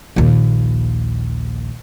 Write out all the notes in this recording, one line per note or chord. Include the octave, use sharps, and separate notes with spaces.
A#1 D#2